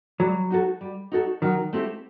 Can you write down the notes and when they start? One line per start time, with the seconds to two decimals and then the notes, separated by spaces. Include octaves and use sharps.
0.19 F#3 G3
0.50 D#4 F#4 A4
0.81 G3
1.12 D#4 F#4 A4
1.42 D#3 F#3
1.73 A3 C4 E4 G4